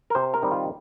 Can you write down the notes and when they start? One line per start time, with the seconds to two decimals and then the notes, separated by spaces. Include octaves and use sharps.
0.10 A#4
0.15 C3 C5
0.34 A#4
0.43 D#3 G3 C4 D#4
0.51 F4